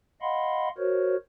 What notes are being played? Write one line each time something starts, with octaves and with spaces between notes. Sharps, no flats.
D#5 F5 F#5 B5 C6
F#4 A#4 C5 C#5